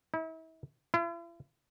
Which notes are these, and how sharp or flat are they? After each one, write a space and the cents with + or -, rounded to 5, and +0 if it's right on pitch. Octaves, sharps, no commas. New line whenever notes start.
E4 -40
E4 +45